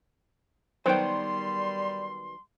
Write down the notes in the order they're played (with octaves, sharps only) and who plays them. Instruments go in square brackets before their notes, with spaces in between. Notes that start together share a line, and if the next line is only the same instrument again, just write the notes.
[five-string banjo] D#3 F#3 B3 [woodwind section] G3 C6 [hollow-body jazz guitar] C5 G5